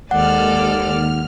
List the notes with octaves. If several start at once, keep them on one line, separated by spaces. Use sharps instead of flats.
D#2 G#3 A4 D5 F#5 F6